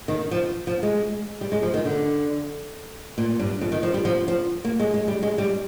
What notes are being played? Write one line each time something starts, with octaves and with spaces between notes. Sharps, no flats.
D#3
F3
F3
G#3
G3
G#3
F3
D#3
D3
A#2
G2
F2
D#3
F3
G3
F3
F3
A#3
G#3
G#3
G3
G#3
G3